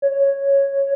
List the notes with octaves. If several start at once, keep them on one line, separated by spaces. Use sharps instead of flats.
C#5